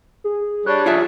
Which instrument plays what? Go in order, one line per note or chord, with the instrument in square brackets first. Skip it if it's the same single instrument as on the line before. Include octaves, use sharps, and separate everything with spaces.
[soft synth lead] G#4
[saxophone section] G3 D4 C#5 [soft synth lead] F#6
[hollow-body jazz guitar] F4 G#4 E5